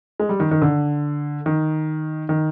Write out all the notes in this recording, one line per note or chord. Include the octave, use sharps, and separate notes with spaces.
G#3
G3
D#3
D#3
D3
D#3
D#3